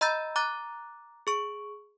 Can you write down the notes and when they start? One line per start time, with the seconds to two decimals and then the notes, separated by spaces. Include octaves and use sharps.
0.01 D#5 A#5 B5 E6 G6 A6
0.36 A#5 D6 F#6 A6
1.27 G#4 C#6 D7